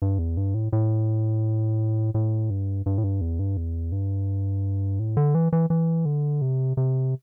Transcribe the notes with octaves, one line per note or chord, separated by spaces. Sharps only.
G2
E2
G2
A2
A2
A2
G2
G2
A2
G2
E2
G2
E2
G2
A2
D3
E3
E3
E3
D3
C3
C3